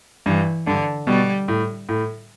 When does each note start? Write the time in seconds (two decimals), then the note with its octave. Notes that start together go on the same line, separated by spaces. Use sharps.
0.26 G2 E3
0.67 G2 D3
1.07 B2 G3
1.48 A2
1.89 A2